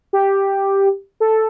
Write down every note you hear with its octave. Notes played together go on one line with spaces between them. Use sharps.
G4
A4